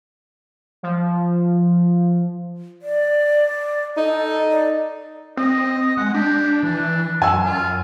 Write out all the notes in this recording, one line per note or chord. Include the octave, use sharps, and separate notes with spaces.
F3
D5
D#4 A4
D5
C4 D#5
G#3 F#5
D4 G4
E3 D4
F#2 G#5 E6
F4